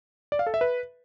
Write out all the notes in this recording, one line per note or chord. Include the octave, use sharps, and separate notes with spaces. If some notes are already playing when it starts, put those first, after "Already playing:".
D5
F5
A4
E5
B4